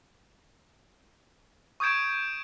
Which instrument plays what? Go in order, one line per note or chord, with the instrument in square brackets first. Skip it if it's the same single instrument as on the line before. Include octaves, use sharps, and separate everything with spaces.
[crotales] C#6 D#6 G6 G#6 D7 E7